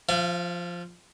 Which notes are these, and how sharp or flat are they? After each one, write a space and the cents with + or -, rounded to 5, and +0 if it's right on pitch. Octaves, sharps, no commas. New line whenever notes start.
F3 +0 F5 -45